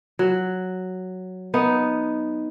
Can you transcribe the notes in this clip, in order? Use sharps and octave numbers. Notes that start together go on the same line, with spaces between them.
F#3
B3 D#4